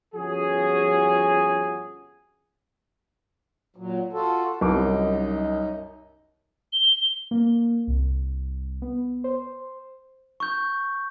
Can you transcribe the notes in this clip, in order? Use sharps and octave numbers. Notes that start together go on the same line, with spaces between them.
G1 F3 C#4 F#4 G#4
A#2 F#3
F4 F#4 A4
C2 F#2 D#4 D6
G7
A#3
C2
B3
C5
C#6 G6